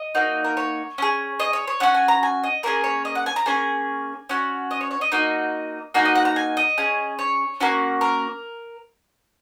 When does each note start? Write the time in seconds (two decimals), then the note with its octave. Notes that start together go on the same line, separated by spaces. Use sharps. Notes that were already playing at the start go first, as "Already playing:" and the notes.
Already playing: D#5
0.15 A#3 D#4 F#4
0.44 A#4
0.57 C#5
0.98 C#4 G#4
1.40 D#5
1.53 C#5
1.67 C#5
1.80 C#4 F#4 F#5
1.94 G#5
2.08 A#5
2.23 G#5
2.43 D#5
2.63 A#3 C#4 G#4 A#4
2.84 C#5
3.05 D#5
3.15 F#5
3.26 G#5
3.36 A#5
3.46 A#3 C#4 G#4 G#5
4.29 C#4 F#4
4.71 D#5
4.81 C#5
4.91 C#5
5.01 D#5
5.12 A#3 D#4 F#4 D#5
5.94 A#3 D#4 F#4 G#5
6.05 D#5
6.15 F#5
6.25 A#5
6.36 G#5
6.57 D#5
6.78 C#4 G#4
7.19 C#5
7.60 A#3 C#4 F#4
8.01 A#4